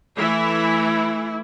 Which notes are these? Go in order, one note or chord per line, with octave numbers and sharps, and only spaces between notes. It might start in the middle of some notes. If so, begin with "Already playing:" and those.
E3 A3 E4 E5